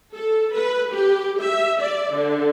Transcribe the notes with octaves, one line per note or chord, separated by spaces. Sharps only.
A4
B4
G4
E5
D5
D3